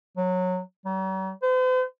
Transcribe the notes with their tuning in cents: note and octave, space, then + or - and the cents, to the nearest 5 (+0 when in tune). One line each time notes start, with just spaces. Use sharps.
F#3 -15
F#3 +45
C5 -45